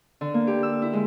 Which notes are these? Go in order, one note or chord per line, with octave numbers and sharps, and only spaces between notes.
D3
A#3
G4
E6
E4
G#3